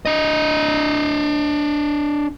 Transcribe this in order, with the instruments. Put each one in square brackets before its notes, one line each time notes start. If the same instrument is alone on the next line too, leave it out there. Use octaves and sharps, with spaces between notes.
[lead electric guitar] D4 D#5